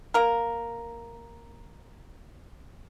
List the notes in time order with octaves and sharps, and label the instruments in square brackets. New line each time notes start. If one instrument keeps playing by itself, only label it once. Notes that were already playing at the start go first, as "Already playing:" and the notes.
[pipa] A#3 A#4